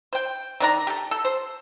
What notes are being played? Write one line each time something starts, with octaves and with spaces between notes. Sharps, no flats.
C5 G5
D#3 D4 A#5
G4 A4
A4
C5